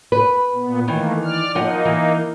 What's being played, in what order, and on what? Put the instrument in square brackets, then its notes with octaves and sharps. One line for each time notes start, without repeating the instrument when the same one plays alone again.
[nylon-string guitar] B4
[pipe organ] A#2 B3
[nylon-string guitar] D#3 E3 [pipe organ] A3 A#3
[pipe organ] D5 F6
[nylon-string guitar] F3 D#5 F#5 [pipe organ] A#3 D#4
[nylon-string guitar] E3